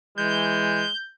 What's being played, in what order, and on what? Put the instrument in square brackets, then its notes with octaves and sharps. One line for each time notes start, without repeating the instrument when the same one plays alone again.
[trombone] E3 [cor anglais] G#3 [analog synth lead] G6